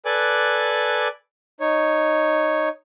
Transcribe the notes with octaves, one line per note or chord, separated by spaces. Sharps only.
A4 B4 D5 G#5 D6 F#6
D#4 C#5